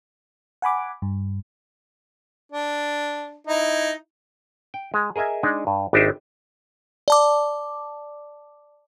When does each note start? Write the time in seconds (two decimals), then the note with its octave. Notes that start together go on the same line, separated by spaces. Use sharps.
0.62 F#5 G#5 B5 D6
1.02 G2
2.52 D4
3.47 D#4 E4
4.74 G5
4.94 G#3
5.16 G#4 A#4 D#5 E5 G#5
5.43 G#3 D4 D#4
5.67 G2
5.93 G#1 D4 D#4 G4 C5 E5
7.08 D5 A5 D6